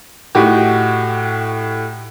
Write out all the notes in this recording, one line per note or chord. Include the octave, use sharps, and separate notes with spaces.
A2 D#4 F#4 G4